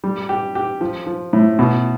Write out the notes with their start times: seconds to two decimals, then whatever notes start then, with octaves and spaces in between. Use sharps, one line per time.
0.04 G3
0.29 G4
0.55 G4
0.81 F3
1.07 F3
1.33 A2
1.59 B2